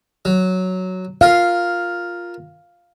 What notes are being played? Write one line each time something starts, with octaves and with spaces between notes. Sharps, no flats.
F#3
F4 A#4 F5